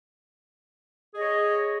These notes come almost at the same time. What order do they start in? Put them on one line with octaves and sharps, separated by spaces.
G#4 D#5 C#5